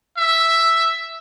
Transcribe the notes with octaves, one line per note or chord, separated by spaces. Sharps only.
E5